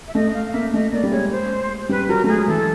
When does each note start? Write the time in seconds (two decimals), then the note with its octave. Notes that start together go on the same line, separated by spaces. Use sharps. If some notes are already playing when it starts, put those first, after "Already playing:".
0.08 E5
0.15 A3 D#5
0.34 F5
0.53 A#3 E5
0.73 A3 D#5
0.93 A#3 D5
1.03 G3
1.11 G#3 C#5
1.31 C5
1.89 G3 B4
2.09 F#3 A#4
2.24 A3
2.28 G#3 G#4
2.48 E3 A4